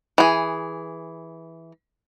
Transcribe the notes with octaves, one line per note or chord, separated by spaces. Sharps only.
E3 G#4